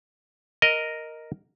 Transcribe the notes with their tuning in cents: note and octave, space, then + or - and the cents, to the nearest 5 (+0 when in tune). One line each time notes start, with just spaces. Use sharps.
A#4 +0 D#5 +0